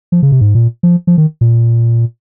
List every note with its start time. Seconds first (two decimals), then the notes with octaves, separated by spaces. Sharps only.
0.12 F3
0.23 C#3
0.32 C3
0.41 G#2
0.55 A#2
0.83 F3
1.07 F3
1.18 D#3
1.41 A#2